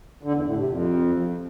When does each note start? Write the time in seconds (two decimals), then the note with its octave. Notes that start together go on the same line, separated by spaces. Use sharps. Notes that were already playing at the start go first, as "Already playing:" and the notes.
0.23 D3
0.34 E2
0.46 A2
0.57 C3
0.69 F2